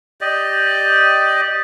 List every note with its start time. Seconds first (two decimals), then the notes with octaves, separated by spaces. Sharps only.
0.21 G4 D5 D#5